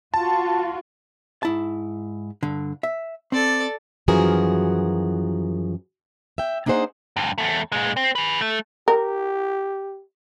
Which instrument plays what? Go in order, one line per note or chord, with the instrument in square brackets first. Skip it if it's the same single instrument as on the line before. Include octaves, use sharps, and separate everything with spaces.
[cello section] F4 F#4 [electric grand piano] A5
[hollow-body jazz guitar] G#2 E4 A5
G2 D3
E5
[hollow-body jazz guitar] C4 [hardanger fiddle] A4 D5
[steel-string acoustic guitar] F#2 E3 F3 F#4 G#4 A#4
E5 G5
A#3 D4 D#4 G#4 C5 F#5
[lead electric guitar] D2 G2
E2 A3
A#2 G#3
C4
G#4 B4
A3
[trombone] G4 [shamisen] A#4